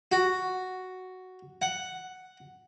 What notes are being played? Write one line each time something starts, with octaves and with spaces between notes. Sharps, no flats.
F#4
F#5